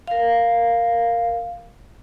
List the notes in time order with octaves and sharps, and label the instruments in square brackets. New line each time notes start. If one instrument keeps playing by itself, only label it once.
[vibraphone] A#4 F5